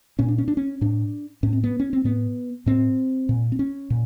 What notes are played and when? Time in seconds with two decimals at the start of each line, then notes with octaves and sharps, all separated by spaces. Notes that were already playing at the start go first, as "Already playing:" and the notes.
0.19 A#2 C#4
0.28 D4
0.38 C#4
0.48 D4
0.57 C#4
0.81 A2 D4
1.43 A2 C#4
1.53 C4
1.64 B3
1.80 C#4
1.93 C4
2.04 A2 B3
2.66 A2 C4
3.29 A#2
3.52 C4
3.59 C#4
3.90 A#2